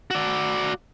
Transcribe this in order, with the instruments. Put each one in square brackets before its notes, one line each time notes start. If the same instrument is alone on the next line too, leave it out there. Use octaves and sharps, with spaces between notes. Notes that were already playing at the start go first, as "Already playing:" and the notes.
[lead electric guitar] F#4 D5